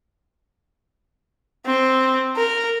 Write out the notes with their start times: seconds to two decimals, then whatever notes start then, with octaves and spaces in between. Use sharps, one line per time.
1.67 C4
2.37 A#4